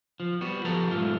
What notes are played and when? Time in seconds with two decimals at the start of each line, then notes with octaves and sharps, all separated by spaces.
0.20 F3
0.41 G3 B3 F#4
0.65 F3 G4 A4 B4 A#5
0.91 B1 G#2 A3 C#4 F4